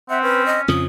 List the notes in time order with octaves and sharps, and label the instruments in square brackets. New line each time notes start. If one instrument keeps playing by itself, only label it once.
[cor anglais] C4 [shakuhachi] E5 [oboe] F#5
[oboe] C#4 [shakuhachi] B4
[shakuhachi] D#5
[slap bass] F2 C#3 F3 [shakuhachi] D#6